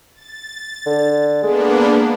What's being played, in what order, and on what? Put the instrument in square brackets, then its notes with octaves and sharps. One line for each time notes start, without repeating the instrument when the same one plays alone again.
[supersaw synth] A6
[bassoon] D3
[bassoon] G#3 [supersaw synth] A#3 B3 D4